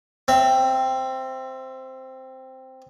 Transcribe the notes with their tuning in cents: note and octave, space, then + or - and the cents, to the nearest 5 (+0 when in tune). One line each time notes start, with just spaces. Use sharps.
C4 +0 E5 +20